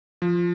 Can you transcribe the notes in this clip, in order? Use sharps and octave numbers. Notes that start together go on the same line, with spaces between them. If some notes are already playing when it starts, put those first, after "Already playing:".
F3